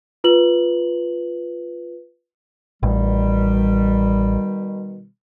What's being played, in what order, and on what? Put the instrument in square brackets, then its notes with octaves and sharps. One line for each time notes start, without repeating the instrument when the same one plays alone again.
[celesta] F4 B4 F#7
[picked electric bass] A1 [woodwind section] B2 D#3 G3